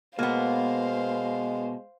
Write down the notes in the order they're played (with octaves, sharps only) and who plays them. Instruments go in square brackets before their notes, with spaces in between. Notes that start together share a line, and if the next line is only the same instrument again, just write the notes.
[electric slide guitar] B2 [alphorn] G#3 [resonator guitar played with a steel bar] A#3 B3 [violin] C5 F5